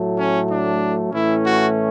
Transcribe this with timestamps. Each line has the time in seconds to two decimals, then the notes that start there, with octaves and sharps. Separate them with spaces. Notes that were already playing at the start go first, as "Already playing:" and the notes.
Already playing: A2 F#3 A3
0.18 C#4
0.49 D4
1.12 A2 E3 A3 C#4 E4
1.44 F#4